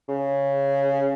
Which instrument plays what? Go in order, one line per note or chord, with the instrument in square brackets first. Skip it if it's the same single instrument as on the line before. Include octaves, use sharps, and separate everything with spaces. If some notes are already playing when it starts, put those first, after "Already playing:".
[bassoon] C#3